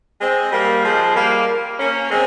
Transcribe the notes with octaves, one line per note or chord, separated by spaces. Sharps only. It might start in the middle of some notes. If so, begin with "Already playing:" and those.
G#3 C4
G3 A#3
F3 G#3
G3 A#3
A#3 C#4
G#3 C4